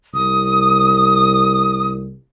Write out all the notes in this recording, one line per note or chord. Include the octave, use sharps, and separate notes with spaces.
C2 D#6